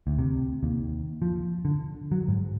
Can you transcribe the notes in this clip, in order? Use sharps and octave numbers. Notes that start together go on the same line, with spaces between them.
D2
C3
D#2
F3
D3
F#3
G#2